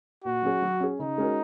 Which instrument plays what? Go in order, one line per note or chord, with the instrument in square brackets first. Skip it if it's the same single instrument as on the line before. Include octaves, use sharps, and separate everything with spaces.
[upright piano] A#2 [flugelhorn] F#4
[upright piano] F#3 C#4 G#4
F#3
C#4 G#4
[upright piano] C#3 [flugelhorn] D#4
[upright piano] G#3 C#4 F#4 A#4